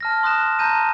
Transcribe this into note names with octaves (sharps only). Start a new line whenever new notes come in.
A5 F6 A#6
C6 D#6 F#6 A#6 E7
A5 A#5 G6 A#6 D#7